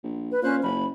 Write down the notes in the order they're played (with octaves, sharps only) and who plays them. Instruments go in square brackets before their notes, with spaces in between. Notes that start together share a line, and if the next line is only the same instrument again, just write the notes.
[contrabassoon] A#1
[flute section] B4
[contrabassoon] A#2 [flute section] C#4 C5 F#6
[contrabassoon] F#1 [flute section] B5